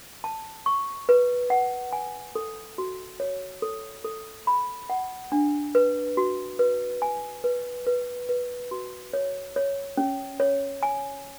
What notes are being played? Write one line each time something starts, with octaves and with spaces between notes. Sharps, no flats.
A5
C#6
B4
F#5
G#5
A4
F#4
C#5
A4
A4
B5
F#5
D4
B4
F#4
B4
G#5
B4
B4
B4
F#4
C#5
C#5
C#4
C#5
G#5